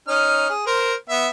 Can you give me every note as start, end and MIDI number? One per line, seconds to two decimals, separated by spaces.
0.08 0.49 61
0.08 0.49 63
0.08 0.49 89
0.50 0.65 68
0.67 0.93 70
0.67 0.93 72
1.09 1.28 59
1.09 1.28 76